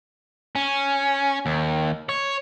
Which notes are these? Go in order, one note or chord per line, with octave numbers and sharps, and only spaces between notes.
C#4
D#2
C#5